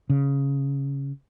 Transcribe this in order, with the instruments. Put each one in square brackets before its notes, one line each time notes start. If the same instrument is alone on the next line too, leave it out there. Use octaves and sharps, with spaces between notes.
[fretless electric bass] C#3